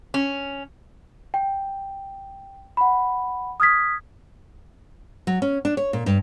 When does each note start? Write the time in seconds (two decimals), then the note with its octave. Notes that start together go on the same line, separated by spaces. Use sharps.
0.14 C#4
1.34 G5
2.77 F#5 B5
3.60 D#6 F6 G#6 B6
5.27 F#3
5.42 C#4
5.65 D4
5.77 C#5
5.93 A#2
6.06 G2